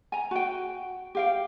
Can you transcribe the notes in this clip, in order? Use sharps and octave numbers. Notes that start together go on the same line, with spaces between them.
G#5 A#5
F#4 G5
G4 F5 G5